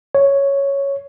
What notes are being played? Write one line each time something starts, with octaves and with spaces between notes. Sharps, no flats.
C#5